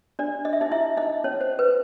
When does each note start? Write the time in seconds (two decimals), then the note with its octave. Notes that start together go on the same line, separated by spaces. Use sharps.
0.19 D4 D5
0.45 D#5
0.53 E5
0.61 D#4 D#5
0.71 E4 E5
0.97 D#4 D#5
1.24 C#4 C#5
1.41 C5
1.59 B4